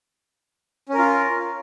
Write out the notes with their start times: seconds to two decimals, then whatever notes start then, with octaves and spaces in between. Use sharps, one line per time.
0.89 C#4
0.94 A#4
0.99 F4